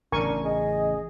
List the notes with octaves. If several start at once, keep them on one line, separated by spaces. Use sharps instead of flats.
A1 C#3 D4 A#4 G#5 C#6
G#4 D#5